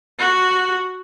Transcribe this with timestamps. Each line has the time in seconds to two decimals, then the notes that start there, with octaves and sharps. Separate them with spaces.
0.19 F#4